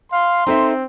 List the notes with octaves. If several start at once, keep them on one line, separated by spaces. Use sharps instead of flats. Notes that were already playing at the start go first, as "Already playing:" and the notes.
F5 C6
C4 D#4 A4 E5